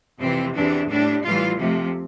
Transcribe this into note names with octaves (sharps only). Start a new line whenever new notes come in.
F2 C3 E3 C4
E2 C3 E3 D4
A2 G3 D4
A2 E3 G3 F4
F2 C3 F3 A3